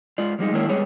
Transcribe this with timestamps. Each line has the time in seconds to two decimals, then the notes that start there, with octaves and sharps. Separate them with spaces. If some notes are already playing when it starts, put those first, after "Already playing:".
0.18 G#3 F4 D5
0.39 F3 G3 G#3 D#4
0.53 D#3 G#3 A#3 D4 E4 C#5
0.69 G3 G#3 B3 G#4 C#5